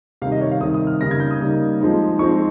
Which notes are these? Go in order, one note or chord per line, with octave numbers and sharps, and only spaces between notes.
C3 D#3 G3 F5
D#5
C#5
F5
C3 D#3 G3 D#6
D#6
F6
C#3 G3 A#3 D#4 A#6
G#6
G6
D#6
C#3 G3 A#3 D#4
F3 G#3 C4 D#4
F3 G#3 C4 D#4 C#6